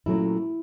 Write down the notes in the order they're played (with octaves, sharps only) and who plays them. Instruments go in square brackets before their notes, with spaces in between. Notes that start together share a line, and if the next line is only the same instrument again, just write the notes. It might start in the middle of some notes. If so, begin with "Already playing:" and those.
[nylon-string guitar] A#2 F#3 A3 C#4 E4